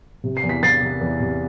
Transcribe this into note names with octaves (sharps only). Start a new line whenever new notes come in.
C3
C7
E2
B6
E2 A6 C7
C3
E2
C3